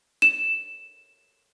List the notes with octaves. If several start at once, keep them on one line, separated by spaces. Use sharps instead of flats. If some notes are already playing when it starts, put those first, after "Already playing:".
E7